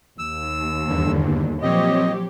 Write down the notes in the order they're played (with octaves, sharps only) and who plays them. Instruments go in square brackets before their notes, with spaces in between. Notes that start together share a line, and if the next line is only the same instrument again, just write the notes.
[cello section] D#2 [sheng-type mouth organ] E6
[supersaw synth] E2 G2 D3
[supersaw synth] A#2 C4 C#5 [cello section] F3 F#3 G4 [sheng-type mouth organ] D#5